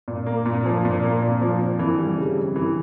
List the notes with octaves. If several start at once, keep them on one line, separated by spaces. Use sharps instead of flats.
A#2
A#3
A#2
F3
A#2
A#3
A#2
F3
F2
E3
G3
C#3
F2
E3